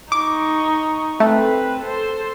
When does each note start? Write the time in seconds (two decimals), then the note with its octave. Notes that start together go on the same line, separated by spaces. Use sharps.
0.12 D#4 C#6 D6
1.20 A3 C4 B4
1.81 A4 C5